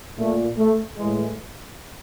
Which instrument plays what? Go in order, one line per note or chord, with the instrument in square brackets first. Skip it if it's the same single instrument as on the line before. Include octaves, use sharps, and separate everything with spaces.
[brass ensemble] A#2 A3
A3
A2 E3 G#3